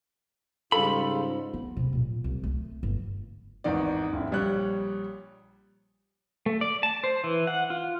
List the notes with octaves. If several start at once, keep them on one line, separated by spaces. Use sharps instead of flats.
G#2 C#3 G3 F4 A4 B5
B3
C#2 C3
A#2 F4
C2
A3
G1
G#1 E2 D#3 D#4 D5
D1 E4
A#1 G3 C#5 F#6
A3
D5
A5
C5
E3
F#5
F4